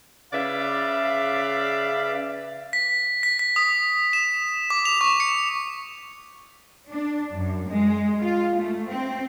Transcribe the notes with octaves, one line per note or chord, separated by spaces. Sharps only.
C#3 B4 D5 E5 F5
B6
B6
B6
D#6
E7
D6
F7
C#6
C#7
D4
F#2
G#3
F4
A3
C4